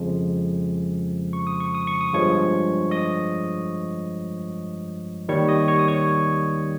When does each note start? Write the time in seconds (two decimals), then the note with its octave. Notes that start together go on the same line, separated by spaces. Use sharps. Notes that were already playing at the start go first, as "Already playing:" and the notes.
Already playing: F2 C#3 F3 G#3
1.33 C#6
1.47 D#6
1.60 C#6
1.75 D#6
1.87 C#6
2.01 D#6
2.12 G1 G2 F3 G#3 C#5 C#6
2.91 D#5 D#6
5.29 D#2 D#3 G3 C#5 C#6
5.49 D#5 D#6
5.68 C#5 C#6
5.79 D#6
5.88 C#5 C#6